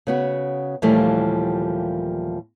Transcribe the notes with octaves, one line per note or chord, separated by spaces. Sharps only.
C#3 B3 F#4
D#2 A#2 E3 F3 G3 A3